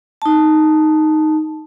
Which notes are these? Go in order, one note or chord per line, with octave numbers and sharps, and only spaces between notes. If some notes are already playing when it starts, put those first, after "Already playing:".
D#4 A5